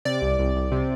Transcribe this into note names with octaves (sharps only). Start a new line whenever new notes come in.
C3 D5
C2
C2
C2
C3